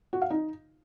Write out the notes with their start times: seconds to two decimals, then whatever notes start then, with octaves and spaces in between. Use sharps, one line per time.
0.13 F#4
0.22 F5
0.30 D#4